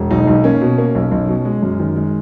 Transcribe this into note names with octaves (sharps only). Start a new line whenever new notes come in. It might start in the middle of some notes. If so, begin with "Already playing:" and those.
Already playing: E1
B1 D#4
B1
A#3 C#4
B2
A#3
B1
B1
B2
G#3
F#2
D#3
G#3